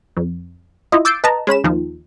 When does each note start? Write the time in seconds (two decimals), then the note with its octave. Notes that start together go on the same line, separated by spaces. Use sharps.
0.17 F2
0.92 E4 F4 D#5
1.05 D6 E6 G6 A6 C7 D7
1.24 B4 D#5 A5 A#5
1.47 G#3 C#4 B5 E7
1.64 D#2 D#3 F3